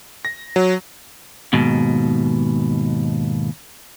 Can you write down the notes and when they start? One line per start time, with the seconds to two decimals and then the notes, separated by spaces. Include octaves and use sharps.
0.25 A#6
0.56 F#3
1.53 D#2 G#2 B2